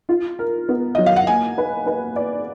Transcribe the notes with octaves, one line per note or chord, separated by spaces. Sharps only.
F4
A#4
B3
F#3 D#5
F5
F#5
A#3 G#5
B4
B4
D5